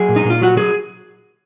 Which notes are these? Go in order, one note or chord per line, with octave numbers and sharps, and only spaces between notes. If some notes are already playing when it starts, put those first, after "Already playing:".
Already playing: F#3 G#4
A#2
D#4
A#2
F4
F#3 F#4
F#3 G#4